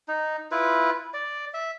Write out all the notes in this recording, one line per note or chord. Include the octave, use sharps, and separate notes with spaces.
D#4
E4 F4 B4
D5
E5